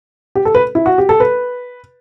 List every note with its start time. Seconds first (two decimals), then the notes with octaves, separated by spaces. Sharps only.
0.35 G4
0.45 A4
0.55 B4
0.75 E4
0.86 F#4
0.98 G4
1.09 A4
1.20 B4